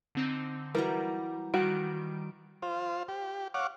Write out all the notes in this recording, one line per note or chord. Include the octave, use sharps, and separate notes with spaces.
D3 C4 D#4
E3 F#3 G3 A#4 A#5
D#3 G3 F#4 D7
F4 C5
G4
C#5 F5 F#5 D6